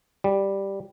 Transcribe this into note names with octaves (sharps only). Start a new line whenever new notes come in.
G3